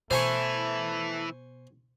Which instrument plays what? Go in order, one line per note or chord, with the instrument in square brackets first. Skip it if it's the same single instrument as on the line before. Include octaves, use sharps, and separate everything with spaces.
[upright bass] B2 [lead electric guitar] E3 E4 [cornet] A3 [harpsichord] C5 G#5 C#6